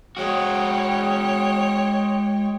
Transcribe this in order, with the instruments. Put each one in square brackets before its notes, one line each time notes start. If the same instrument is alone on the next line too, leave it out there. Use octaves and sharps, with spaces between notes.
[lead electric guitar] G#3 F#4 [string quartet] C#5 G5